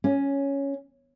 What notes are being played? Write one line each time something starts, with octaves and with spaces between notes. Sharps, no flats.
C#4